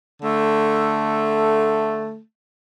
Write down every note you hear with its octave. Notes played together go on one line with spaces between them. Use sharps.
D3 A3